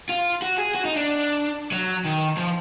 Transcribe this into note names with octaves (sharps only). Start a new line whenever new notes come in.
F4
F#4
G#4
F#4
D#4
D4
F#3
D#3
F3